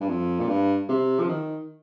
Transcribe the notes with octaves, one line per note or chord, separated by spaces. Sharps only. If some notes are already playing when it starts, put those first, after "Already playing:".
G2
F2
A#2
G2
C3
F3
D#3